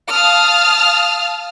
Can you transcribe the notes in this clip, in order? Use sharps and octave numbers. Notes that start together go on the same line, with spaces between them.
F5 A5 D#6 F6